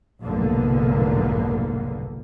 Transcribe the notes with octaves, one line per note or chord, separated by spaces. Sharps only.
F1 B1 G#2 D3 A#3 B3